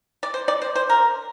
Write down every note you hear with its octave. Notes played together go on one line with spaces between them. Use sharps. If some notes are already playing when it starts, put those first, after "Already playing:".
D5
C5
D5
C5
C5
A#4